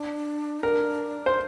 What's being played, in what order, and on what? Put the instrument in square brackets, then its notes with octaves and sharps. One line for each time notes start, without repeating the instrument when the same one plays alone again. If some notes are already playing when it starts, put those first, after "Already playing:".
Already playing: [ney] D4
D#4
[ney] D4 [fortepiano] A#4
[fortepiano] C5